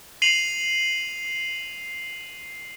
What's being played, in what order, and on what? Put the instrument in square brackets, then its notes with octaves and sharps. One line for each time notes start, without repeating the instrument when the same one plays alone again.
[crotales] C7 D#7 F7 F#7